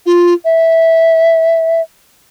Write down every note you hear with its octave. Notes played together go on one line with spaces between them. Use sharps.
F4
E5